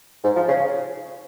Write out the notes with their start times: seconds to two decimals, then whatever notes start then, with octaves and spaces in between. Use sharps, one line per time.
0.24 G#2
0.36 F3
0.48 C#3